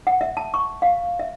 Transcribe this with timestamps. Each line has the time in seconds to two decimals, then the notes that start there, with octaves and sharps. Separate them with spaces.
0.07 F#5
0.21 E5
0.37 A5
0.54 C#6
0.82 F5
1.19 E5